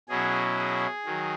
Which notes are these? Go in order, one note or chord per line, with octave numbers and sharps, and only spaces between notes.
B2 F#3 C#4 E4 G#4
G#4
D#3 F#3